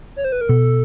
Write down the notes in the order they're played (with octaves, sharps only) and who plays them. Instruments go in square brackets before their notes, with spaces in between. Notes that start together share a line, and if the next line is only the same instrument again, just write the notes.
[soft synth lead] C#5
C5
B4
A#4
[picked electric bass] B2 [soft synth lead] A4